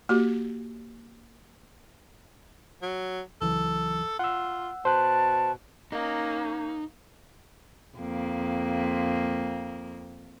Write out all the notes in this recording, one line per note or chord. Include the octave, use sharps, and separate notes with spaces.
A#3 F#4 G4
F#3
C#2 E3 F#3 A4
F4 F#5 E6
B2 C5 A5 F#6
A#3 C#4 D#4
F2 A#3